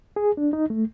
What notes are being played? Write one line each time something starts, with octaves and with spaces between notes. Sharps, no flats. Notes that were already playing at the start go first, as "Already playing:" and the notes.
G#4
D4
D#4
A3